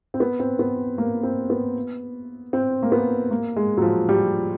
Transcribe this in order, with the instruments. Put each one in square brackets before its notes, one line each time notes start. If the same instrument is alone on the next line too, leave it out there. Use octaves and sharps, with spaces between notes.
[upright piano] C4
B3
C4
B3
A#3
C4
B3
C4
A#3
B3
A#3
G#3
F#3
F3
G3